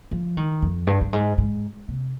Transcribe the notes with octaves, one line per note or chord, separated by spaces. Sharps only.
F3
D#3
F2
G2
G2
G#2
G#2
C3